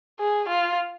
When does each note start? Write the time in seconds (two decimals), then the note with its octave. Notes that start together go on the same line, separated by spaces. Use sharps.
0.20 G#4
0.49 F4